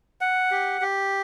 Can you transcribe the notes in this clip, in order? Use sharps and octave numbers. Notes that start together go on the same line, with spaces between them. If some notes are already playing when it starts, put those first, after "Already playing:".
F#5
G4
G4